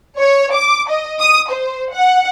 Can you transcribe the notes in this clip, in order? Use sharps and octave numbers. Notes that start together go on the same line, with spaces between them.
C#5
D6
D#5
D#6
C5
F#5